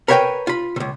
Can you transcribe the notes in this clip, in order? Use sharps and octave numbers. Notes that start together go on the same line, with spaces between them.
A#4 B4 C#5 E5 G5 G#5
F4 B5
C#2 C3